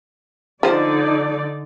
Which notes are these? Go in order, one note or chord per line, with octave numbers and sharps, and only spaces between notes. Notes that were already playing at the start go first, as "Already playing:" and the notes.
D3 F3 D#4 C5 D5